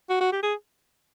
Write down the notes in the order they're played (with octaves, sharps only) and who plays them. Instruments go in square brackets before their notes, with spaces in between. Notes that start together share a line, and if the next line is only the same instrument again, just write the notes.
[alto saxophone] F#4
F#4
G4
G#4